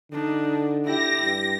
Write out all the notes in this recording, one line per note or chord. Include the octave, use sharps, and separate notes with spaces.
D3 D4 D#4
E4 G4 A#6
G2